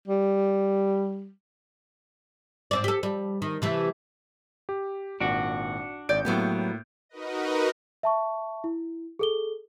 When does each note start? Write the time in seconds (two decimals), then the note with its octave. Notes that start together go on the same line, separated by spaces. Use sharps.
0.08 G3
2.71 G#2 C4 D5
2.84 G4 A4
3.03 G3
3.42 D#3
3.62 C3 E3 A3
4.69 G4
5.20 G#1 A#2 D4 F#4
6.09 G#1 D5 G6 D7
6.25 A2 F#3 A#3 B3 G4
7.09 D#4 F#4 A#4 B4 D#5
8.03 E5 A5 C#6
8.64 E4
9.19 G#4 A4 G7